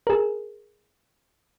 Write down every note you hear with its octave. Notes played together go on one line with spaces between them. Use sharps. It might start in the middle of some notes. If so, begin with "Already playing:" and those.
G#4 A#4